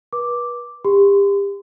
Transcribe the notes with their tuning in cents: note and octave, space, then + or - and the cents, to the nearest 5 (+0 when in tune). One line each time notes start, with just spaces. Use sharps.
B4 -35 D6 +0
G4 +30 C6 -35